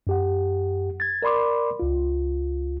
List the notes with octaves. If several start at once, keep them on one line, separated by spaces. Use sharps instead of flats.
F#2 G4 F#5
G#6 A6
A#4 D5 B5 C6 D6
C#2 F4